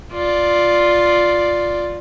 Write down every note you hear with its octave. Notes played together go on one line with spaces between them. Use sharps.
F4 D5